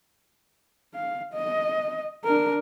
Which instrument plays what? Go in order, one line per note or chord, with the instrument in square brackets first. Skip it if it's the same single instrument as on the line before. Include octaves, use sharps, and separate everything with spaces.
[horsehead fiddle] F5
D#5
D4 A#4